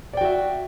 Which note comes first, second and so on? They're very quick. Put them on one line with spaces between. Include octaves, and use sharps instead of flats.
D5 G5 F#4 E5